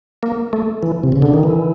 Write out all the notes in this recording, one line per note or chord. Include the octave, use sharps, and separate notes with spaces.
A#3
A3
E3
C3
C#3
D3
D#3
E3